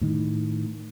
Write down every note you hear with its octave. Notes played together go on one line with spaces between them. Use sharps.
A2 D#3